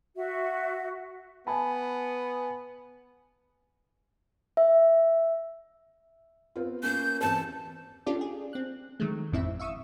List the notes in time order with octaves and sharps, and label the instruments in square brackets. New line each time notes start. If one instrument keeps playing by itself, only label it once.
[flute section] F#4 E5
[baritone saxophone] B3 [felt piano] G#5 A5 B5
[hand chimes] E5
[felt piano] B3 C4 F4
[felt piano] A#3 C#4 [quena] G6
[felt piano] E2 C4 [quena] A5
[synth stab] C#4 D4 F4 G4 A4 D5
G#4
C4 F#6
D#3 F#3 G#3 A3
G1 F2 A2 C4 E4 E5
E5 F5 C#6 D#6 E6